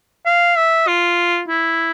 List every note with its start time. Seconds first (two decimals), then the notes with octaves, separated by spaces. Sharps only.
0.26 F5
0.56 E5
0.87 F4
1.48 E4